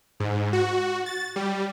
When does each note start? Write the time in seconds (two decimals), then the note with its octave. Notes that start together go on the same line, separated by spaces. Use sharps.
0.20 G#2
0.53 F#4
1.06 A6
1.36 G3